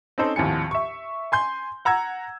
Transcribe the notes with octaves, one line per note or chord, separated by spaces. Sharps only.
C4 C#4 D#4 A4 C5
G#1 D#2 A2 F3 G#5 C#7
E5 C#6
G#5 C6 G6
F#5 A#5 E6 G#6